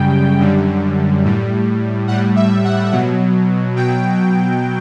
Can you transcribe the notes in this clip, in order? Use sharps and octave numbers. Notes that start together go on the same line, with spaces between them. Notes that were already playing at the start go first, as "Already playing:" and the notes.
Already playing: F#2 C#3 G3 G5
F#2 D3 G3
A2 G3
A2 G3 F#5
E5
F#5
B2 F#3
B2 F#3 G5